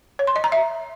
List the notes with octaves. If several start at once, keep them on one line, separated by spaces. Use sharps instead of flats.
C#5
C6
D#5
A#5
E5